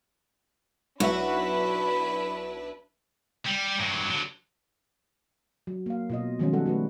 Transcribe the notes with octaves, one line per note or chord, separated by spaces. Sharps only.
B1 D4 E4 F#4 B4 E5 B5
G3
G2 F#3
D3 F#3
F#3
A#3 F5
B2 F4 D#5
D#3 F3 F#3 G#3 C#4
G3 A4 F#5
A3 F#4 B4